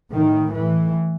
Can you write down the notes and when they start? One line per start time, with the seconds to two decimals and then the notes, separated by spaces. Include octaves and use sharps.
0.13 A2 D#3
0.54 A2 E3